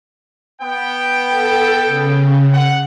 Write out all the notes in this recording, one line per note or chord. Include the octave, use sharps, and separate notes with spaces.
B3 G5
A4
C#3
F#5